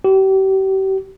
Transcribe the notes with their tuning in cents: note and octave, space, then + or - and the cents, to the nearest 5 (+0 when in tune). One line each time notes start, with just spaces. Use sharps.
G4 -35